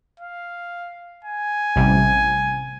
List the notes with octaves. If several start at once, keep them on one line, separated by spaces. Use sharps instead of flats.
F5
G#5
A1 C3 G3